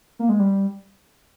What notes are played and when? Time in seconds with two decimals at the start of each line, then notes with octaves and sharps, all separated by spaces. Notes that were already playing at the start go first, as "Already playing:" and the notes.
0.19 A#3
0.29 G#3
0.39 G3